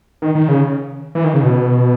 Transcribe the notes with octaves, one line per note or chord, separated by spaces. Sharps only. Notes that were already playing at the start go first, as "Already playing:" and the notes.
D#3
D#3
C#3
E3
D#3
C#3
B2